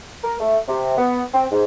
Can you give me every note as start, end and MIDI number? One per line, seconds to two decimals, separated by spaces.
0.23 0.34 70
0.40 0.58 57
0.68 0.96 48
0.98 1.22 59
1.34 1.46 60
1.52 1.64 44